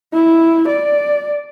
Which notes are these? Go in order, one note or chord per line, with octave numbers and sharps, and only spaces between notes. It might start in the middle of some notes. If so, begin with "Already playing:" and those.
E4
D5